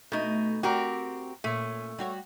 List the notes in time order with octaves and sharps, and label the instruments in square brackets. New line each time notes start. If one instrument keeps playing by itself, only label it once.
[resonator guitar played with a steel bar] B2 D#4 [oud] A3
[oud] C4 D5 [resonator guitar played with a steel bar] F#4 G4 A#4
[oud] A#2 C#4 [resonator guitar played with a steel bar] A3
[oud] G3 F#4 C#5